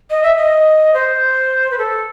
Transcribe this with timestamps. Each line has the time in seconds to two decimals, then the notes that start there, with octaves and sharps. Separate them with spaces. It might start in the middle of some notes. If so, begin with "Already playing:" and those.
0.10 D#5
0.23 E5
0.37 D#5
0.94 C5
1.71 B4
1.78 A4